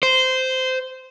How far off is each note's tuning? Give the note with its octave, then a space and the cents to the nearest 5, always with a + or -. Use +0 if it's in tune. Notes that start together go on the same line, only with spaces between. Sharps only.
C5 -15